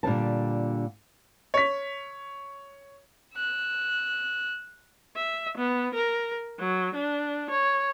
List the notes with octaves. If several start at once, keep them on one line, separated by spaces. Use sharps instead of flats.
A#2 D3 G3 A5
C#5 B6
E6 F#6
E5
B3
A#4
F#3
D4
C#5